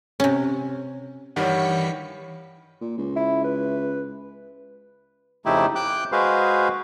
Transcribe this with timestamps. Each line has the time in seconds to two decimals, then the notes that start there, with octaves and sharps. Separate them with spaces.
0.20 C3 C#4
1.36 G2 D#3 E3 G3 C#5 F#5 B6 C#7
2.81 A#2
2.98 C#2
3.16 E4
3.44 B4
5.46 F2 C#3 A3 D#4 E4 G4
5.75 G5 D6 F#6 G6
6.12 G#3 F#4 G#4 B4 C5 F5